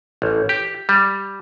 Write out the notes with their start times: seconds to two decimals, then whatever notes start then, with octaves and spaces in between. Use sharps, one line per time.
0.22 A1
0.49 G4
0.89 G3